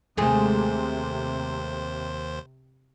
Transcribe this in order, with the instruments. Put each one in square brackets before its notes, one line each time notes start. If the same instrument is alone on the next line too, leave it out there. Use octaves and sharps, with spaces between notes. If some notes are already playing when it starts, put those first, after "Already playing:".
[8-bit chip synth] D#2 C5 [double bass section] C3 [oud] G#3 A3 G#4